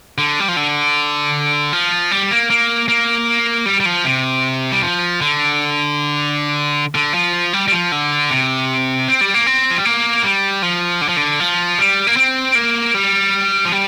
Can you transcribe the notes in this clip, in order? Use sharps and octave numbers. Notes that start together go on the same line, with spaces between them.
D3
G3
F3
D3
F3
G3
A#3
A#3
A#3
G3
G3
F3
C3
G3
F3
D3
D3
F3
G3
G3
F3
D3
C3
C4
G3
A#3
C4
F3
G3
A#3
G3
F3
D3
F3
D3
F3
G3
A#3
C4
A#3
G3
F3
G3